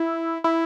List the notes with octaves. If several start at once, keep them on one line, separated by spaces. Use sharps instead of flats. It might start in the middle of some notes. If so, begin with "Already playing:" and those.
Already playing: E4
E4